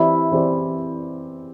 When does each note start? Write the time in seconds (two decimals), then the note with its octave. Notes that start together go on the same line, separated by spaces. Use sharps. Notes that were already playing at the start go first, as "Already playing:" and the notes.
Already playing: E3 C4 E4 G4 D5
0.31 E3 C4 G4 D5